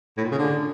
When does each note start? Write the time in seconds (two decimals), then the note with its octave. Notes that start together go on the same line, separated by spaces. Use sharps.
0.17 A2
0.24 A#2
0.31 C#3
0.38 D3